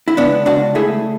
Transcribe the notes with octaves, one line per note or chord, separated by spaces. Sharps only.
E4
C#2 B3 D4
C#2 D4 F#4
A3 E4 G#4